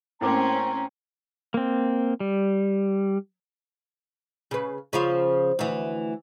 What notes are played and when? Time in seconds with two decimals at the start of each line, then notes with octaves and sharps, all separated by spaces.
0.21 A2 A#3 C4 C#4 A#5 D6
1.54 A#3 C4
2.20 G3
4.51 C#3 B4
4.93 C#3 F3 F4
5.59 D2 E3